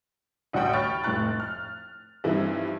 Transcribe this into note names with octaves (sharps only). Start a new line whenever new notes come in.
A1 D2 F#4 F#5 G5 D#6
C#5 G5 B5 C#6 F6 A6
F1 A2 C#6 F#6 A6
F6
G2 E3 F3 C4 D#4 E4